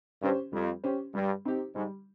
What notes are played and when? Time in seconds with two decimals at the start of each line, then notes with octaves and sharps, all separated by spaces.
0.22 G2 C#4 G4 C5
0.53 F2 G3
0.84 C#4 G4 C5
1.14 G2 G3
1.45 C4 D#4 G4
1.75 G#2 G3